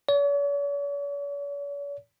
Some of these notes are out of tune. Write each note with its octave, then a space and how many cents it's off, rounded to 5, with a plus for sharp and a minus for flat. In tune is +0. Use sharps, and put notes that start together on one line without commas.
C#5 +45